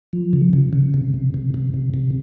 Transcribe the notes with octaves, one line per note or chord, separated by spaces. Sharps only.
F3
C#3
C#3
C#3
C3
C3
C3
C3
C3
C3